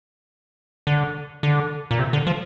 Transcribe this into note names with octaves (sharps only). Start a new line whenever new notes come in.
D3
D3
A#2
C3
D3
F3